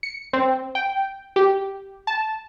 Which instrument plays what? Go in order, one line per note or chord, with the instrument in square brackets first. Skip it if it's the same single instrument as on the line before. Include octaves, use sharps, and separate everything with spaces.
[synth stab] C#7
C4
G5
G4
A5